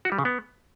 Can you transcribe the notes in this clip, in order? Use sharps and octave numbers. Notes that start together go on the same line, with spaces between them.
F#4
G3
C#3
B3